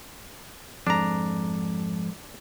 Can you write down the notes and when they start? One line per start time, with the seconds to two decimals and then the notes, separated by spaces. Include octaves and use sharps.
0.87 F2 G#2 D4 A#5